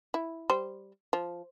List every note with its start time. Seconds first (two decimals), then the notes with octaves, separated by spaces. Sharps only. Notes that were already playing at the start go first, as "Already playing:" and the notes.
0.14 E4
0.50 G3 C5
1.13 F3